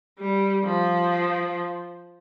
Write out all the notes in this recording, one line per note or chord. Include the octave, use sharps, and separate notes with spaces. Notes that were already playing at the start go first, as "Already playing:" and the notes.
G3
F3